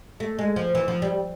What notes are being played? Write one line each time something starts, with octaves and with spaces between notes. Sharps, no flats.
A3
G#3
F3
E3
F3
G3